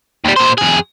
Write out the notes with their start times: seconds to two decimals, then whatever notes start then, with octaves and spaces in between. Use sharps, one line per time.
0.25 D#2 G3
0.36 A#2 C5
0.58 F2 G#4